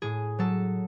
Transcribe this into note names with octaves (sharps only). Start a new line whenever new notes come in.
A2 G#4
F#3 A4